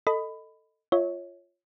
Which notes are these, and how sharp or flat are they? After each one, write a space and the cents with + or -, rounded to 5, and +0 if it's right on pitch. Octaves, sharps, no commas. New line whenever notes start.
A4 +15 D#5 +0 B5 +20
F4 +0 C#5 +0 E5 -35